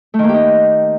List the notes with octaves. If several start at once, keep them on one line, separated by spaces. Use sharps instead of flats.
A3
D#3
A#3
G4
D#4